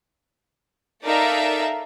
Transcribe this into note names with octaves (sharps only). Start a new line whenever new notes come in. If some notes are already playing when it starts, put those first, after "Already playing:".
D#4 A4 A#4 D5 E5 F5